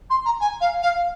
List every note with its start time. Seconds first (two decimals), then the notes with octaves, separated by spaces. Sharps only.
0.10 C6
0.25 A#5
0.40 G#5
0.61 F5
0.82 F5